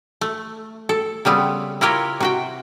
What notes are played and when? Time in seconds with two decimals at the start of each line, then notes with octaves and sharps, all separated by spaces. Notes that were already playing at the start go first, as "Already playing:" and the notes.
0.21 A3
0.89 A4
1.25 C#3 G3 B3 C4
1.81 E4 F4 G4 A#4 C#5
2.20 C3 F#4 G5